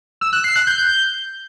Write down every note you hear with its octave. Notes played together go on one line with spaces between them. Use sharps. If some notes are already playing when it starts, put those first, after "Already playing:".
E6
F#6
C7
F#6
G6